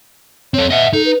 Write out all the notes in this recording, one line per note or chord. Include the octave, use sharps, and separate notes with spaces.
C4 A4 C#5
D#5 E5 F#5
D#4 A4
B4